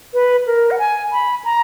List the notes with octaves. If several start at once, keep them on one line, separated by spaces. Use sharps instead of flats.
B4
A#4
F#5
G#5
B5
A#5